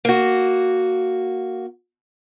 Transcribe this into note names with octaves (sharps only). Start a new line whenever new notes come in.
A#3 F#4